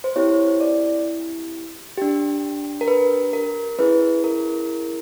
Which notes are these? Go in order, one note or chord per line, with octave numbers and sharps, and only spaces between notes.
C5
C4 E4 G4 C#5
D5
D4 G4
A#4
B4
A#4
C#4 E4 G#4 B4
A#4